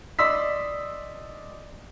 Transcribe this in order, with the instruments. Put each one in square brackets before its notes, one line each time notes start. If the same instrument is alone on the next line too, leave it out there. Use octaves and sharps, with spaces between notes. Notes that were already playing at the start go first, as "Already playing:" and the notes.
[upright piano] D5 D#5 C6 D#6 E6 B6